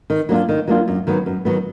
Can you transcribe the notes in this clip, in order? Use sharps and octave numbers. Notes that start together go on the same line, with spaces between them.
D#3
F#3 A#3 D4 F4
D#3
F#3 A#3 D4 F4
F#2
D#3 F#3 B3
F#2
D#3 F#3 B3